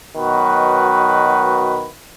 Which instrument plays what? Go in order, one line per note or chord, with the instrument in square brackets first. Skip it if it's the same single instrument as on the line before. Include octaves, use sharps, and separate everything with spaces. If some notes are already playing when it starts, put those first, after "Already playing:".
[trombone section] B2 D#3 F#3 F#4 B4